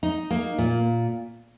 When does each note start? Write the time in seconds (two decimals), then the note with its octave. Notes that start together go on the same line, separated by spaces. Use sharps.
0.03 D#4
0.31 A#3
0.58 A#2